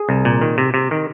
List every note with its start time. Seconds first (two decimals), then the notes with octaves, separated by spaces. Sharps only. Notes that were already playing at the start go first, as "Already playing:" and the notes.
Already playing: G#4
0.09 C2
0.25 A#2
0.41 D#3
0.58 C3
0.74 C3
0.91 D#3